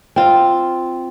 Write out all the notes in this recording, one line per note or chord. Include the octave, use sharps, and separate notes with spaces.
C4 F4